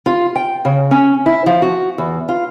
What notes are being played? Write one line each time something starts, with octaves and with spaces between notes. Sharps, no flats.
F4
G5
C#3
C#4
E4
F3
F#4
E2
F4